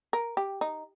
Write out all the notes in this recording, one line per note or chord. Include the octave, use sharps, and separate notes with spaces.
A#4
G4
D#4